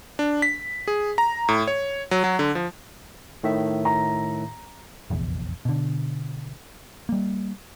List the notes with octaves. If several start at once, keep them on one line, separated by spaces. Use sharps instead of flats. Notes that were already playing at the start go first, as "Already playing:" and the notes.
D4
B6
G#4
A#5
A2
C#5
F#3
F#3
D3
F3
A2 D#3 E5
A#5
F1 A#1 E2
B2 D3
G3 A#3